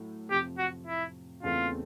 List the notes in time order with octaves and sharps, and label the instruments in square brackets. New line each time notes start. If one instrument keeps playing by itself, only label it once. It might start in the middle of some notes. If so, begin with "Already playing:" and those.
Already playing: [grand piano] A2 F#3 A3
[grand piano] F2 C3 F3 [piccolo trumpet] G4
[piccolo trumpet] F#4
E4
[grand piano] E2 C#3 E3 A3 C4 [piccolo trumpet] F4